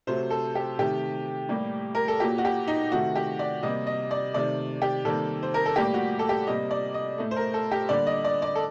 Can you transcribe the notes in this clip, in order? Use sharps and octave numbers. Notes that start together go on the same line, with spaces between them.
C3 F#3 A3 C5
A4
G4
C3 D#3 A3 G4
A2 G3 A#3
A#4
A4
A#2 F#3 A#3 G4
F#4
G4
D#4
C3 D#3 A3 F#4
G4
D5
C3 G3 A#3 D#5
D#5
D5
C3 D#3 A3 D5
G4
C3 D#3 G3 A#3 A4
C5
A#4
A4
A2 G3 A#3 G4
F#4
A4
G4
C3 G3 A#3 D#5
D5
D#5
A2 A3
C5
A#4
A4
G4
D3 G3 A#3 D5
D#5
D5
D5
A4